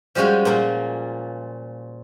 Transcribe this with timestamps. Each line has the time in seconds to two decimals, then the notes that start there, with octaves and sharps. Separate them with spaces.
0.15 F3 G3 G#3 C#4 F4 F#4
0.45 A#2 A#3 F4